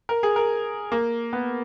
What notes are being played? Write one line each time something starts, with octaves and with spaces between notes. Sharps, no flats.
A#4
G#4
A#4
A#3
B3